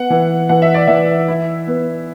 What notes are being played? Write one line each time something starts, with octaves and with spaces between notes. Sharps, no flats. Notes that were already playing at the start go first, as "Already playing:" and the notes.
Already playing: B3 F#5
E3
E3 F#5
E5
D5
E3 E5
E4
B3